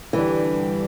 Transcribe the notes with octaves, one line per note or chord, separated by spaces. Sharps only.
G2 D3 E3 G3 D4 G4